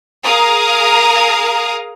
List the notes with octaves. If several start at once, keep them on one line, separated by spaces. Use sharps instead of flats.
G#4 A#4 F5 A#5 D#6